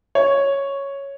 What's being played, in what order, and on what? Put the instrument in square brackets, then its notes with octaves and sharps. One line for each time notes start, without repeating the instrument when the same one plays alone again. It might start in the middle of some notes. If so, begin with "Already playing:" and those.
[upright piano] C#5